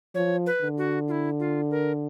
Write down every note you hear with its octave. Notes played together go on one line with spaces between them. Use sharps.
F3 C#5
B4
D3
F#4
F4
E4
F4
A#4